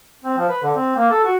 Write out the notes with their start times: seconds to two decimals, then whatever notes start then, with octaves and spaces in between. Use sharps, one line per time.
0.25 C4
0.37 F3
0.49 B4
0.63 D3
0.75 C4
0.97 A#3
1.11 A4
1.24 F#4